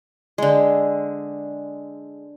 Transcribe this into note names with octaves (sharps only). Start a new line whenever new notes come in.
D3 G#3